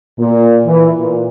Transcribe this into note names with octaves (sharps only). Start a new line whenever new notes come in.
A#2
E3
A#2